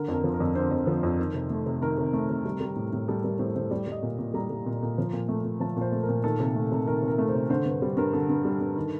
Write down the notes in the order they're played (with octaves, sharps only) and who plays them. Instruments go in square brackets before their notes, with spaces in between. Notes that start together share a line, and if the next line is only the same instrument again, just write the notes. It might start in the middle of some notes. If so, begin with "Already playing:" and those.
Already playing: [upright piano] D3 A#4
F2
A#4
F3
A#4
F2
D3 C5
F2
F3
F2
D#3
C3
A3
C3
D#3 A#4
C3
A3
C3
G3
G3
A2
A2
G3 A4
G3 A#4
A2 C5
A2 C5
G3 D5
G3 D#5
A#2
A#2
G3 A#5
G3
A#2
A#2
F3
A#2
A3
A#2
F3 A5
A#2 C5
A3
A#4
A#2
D#3 A4
C3
A3
C3
D#3 A#4
C3
A#4
A3
C5
C3
D3 C5
G2
G3 C5
G2 A#4
D3 A4
G2
G3
G2
D#3